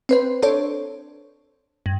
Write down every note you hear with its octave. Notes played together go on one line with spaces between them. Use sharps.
C4 B4 C5
D4 A4 C5 C#5
G2